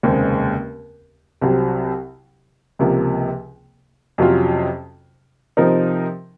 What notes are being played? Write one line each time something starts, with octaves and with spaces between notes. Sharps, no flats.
F1 D#2 C#3 G#3 C4
C2 C3 F#3 C4
C#2 C3 F3 A#3
F2 C3 F#3 C#4 F4
C3 F3 C4 D#4 A#4